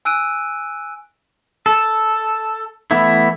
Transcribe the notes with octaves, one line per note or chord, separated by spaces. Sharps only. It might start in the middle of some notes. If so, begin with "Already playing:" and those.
G#5 E6 F#6 D7 D#7
A4
E3 A3 B3 E4